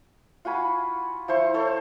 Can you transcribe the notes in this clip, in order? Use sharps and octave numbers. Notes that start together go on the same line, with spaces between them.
F4 F#4 G#5 B5
F3 E4 C5 C#6
A4 C5 C#5